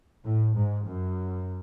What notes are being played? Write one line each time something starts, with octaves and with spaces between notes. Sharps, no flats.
A2
G#2
F#2